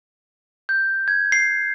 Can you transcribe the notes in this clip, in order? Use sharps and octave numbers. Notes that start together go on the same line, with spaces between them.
G6
G#6
C7